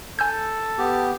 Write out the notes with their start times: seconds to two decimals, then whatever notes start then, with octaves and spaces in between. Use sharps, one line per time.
0.19 A4 G#5 E6 G6
0.78 B3 G4